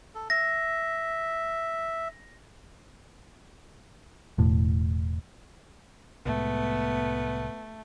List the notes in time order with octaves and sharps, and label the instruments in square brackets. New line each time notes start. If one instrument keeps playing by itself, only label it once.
[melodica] A4
[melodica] E5 [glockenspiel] A#6
[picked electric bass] E1 A2
[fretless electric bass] C2 A2 G#3 [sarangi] A3 [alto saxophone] B3